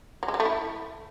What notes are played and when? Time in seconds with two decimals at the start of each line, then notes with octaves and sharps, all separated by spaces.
0.23 F#3
0.28 G#3
0.34 F#3
0.40 A3
0.45 E4